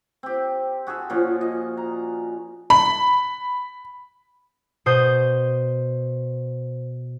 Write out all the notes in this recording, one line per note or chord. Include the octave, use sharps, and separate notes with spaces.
C4 G4
F#4 G#4 A4 E5
A#2 F3 C#4 F#4
D#5
A#5
B5
B2 C5 D#6 G6